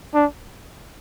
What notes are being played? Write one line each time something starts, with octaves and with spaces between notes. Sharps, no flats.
D4